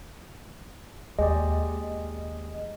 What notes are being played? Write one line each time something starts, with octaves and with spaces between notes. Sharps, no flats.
D#2 G#3 G4 D5 D#5